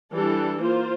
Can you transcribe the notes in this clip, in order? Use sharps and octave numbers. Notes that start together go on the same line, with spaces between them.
E3 G3 D4 A4
A#3 F4 C5